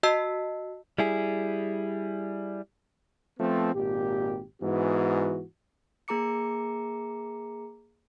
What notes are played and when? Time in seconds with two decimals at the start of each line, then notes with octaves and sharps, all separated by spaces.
0.03 F#4 D#5 A5 E6 B6 C7
0.99 G3 E4 G#4
3.39 F3 A3 B3 C4
3.75 G#1 A#2 G4
4.62 G#2 E3 B3 F#4
6.08 A#3 G#4 A#5 D6 C#7